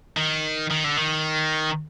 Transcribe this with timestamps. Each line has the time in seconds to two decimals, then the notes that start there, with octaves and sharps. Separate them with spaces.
0.17 D#3
0.70 D#3
0.84 D3
0.97 D#3